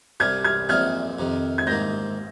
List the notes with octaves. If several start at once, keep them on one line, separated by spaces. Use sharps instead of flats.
C2 C3 G3 F6 G#6
F6 G#6
A#1 A#2 F3 C4 D#4 F6 G#6
F2 C3 D#3
G#6
G#2 D#3 A#3 G6 A#6